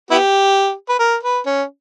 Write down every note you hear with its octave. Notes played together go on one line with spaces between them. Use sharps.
B3 E4 G4
B4
A#4
B4
C#4